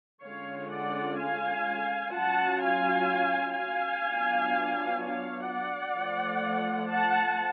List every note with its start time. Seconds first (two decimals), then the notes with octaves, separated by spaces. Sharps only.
0.24 D3 G#3 C#4 F4 C#5 F5
0.71 D5 F#5
1.19 F5 G#5
2.14 F#3 C#4 F4 F#5 A5
2.62 F5 G#5
3.57 F5 G#5
4.05 F#3 B3 D4 F4
5.00 C#5 F5
5.48 D5 F#5
5.95 F3 A3 F4
6.90 F#5 A5